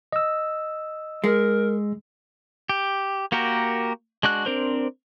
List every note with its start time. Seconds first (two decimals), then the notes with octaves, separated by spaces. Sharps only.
0.13 D#5 E6
1.24 G#3 A#4
2.69 G4
3.32 A#3 F#4 G4 A#4
4.23 G#3 D4 F#4 F#6
4.46 C4 D4 A#4 C5